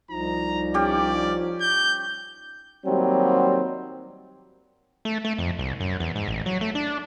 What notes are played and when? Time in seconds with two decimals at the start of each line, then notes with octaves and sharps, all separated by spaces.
0.11 C2 F3 D#4 A#5
0.74 C#4 G4 D5
1.61 G6
2.85 D#2 F#3 G3 C4
5.05 A3
5.25 A3
5.38 F2
5.59 C2
5.80 F#2
6.00 E2
6.16 G#2
6.28 A1
6.46 F#3
6.61 A3
6.75 D4